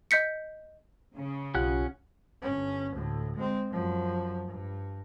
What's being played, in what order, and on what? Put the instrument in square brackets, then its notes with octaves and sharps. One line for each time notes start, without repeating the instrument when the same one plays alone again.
[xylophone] D#5 G6 B6 C#7
[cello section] C#3
[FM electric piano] B1 F4 G4 [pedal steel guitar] C#4 F#5 F#6
[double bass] G1 C#4
D2 A2
G#3 C4
F#2 F3
G2